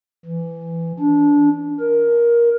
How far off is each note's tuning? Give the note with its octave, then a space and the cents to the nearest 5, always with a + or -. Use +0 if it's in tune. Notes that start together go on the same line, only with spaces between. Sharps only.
E3 +15
D4 -20
A#4 +15